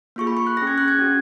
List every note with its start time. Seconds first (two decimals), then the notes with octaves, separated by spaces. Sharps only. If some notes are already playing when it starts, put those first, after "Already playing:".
0.16 A#3 F4 G#4 C#6
0.27 B5
0.37 C#6
0.47 F#6
0.57 C#4 G#4 A#6
0.67 G#6
0.78 F#6
0.88 G#6
0.98 C#4 F#4